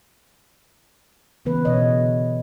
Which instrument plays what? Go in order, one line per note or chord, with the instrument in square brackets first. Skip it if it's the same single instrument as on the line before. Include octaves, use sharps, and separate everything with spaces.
[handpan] C#3 E3 B3 B4
B2 D3 C#5 D#5